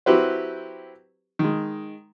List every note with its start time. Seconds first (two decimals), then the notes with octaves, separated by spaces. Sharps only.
0.06 F#3 C4 E4 G4 B4 C5
1.39 D#3 G#3